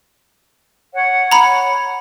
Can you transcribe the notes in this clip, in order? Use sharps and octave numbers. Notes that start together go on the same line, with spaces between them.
C#5 F#5
A#5 B5